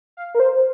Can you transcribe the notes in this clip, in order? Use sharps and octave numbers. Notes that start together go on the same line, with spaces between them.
F5
A#4
C5